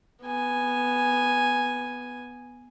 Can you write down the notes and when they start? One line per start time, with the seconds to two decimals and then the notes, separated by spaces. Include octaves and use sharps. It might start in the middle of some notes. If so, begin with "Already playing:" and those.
0.23 B3 G#5